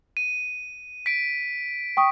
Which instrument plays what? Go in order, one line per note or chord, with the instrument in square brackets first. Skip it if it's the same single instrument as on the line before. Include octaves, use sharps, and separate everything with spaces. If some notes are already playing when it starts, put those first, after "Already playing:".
[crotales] D#7
B6 D7
[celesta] G5 C#6 D#6